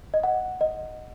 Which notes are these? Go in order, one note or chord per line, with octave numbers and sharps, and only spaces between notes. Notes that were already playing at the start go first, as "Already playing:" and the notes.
D#5
F#5
D#5